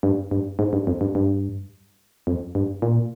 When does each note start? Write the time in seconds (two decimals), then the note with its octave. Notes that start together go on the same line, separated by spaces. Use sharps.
0.03 G2
0.31 G2
0.59 G#2
0.73 G2
0.87 F2
1.01 G2
1.15 G2
2.27 F2
2.55 G2
2.82 A#2